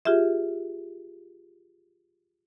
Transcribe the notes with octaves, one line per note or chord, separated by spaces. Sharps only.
F4 G4 G#4 E5